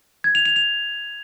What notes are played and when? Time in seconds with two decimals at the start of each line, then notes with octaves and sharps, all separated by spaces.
0.24 G#6
0.35 F7
0.46 F7
0.56 F7